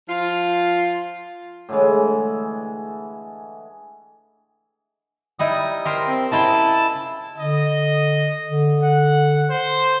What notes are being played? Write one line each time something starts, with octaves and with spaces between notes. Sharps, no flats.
F3 F4
A2 D3 E3 G#3
G3 D#4 E4 D#6
G4 A#4 C5
C4
C#3 E4 D#5 G5 A5
D3 D#5
D3
F#5
C5